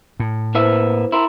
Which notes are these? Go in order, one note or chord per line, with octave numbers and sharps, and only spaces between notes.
A2
A#3 E4 B4 C5 E5
E4 A#4 C6